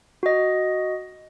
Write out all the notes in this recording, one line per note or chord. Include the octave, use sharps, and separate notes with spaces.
F#4 D#5